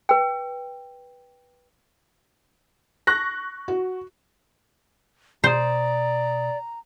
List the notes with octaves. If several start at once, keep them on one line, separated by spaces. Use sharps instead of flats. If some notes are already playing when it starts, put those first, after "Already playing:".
B4 G5
C#6 F#6 A#6
F#4
B2 C5 D5 A#5 D#6